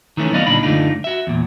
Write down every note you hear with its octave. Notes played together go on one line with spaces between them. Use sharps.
D#3 E3 A3 C#4
F#3 B3 D5 D#5 F5
D2 A#2 D4 D#4 B5
F#2 D3 A3 D4 D#4 F4
F#4 E5
E2 A#2